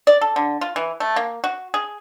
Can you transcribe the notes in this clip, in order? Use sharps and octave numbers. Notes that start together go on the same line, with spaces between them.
D5
A4
D3
F4
E3
A3
A#3
F#4
G#4